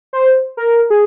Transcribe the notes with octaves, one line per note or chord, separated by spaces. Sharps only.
C5
A#4
G#4